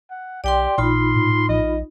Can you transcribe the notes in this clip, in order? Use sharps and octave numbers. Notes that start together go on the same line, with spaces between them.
F#5
B1 G4 D5 G5 C6
A1 A#2 D#4 F4 B5 C6
A2
A#1 D#5